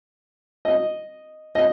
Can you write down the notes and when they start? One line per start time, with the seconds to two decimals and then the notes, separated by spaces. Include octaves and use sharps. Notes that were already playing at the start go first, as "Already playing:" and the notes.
0.65 D#5
1.55 D#5